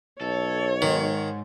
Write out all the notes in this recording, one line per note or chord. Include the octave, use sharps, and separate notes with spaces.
B1 A4 C#5
G#2 D#3